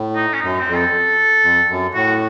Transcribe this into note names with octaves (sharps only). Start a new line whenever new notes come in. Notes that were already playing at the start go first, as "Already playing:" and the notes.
Already playing: A2
D#4
C#4
F#2 D#4
C4
F2
A4
F2
F#2
A2 F#4